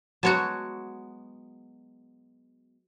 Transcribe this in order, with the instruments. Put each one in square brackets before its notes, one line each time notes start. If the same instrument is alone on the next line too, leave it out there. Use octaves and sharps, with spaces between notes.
[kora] F#3 G#3 B3 [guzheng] F#4 C#5 A5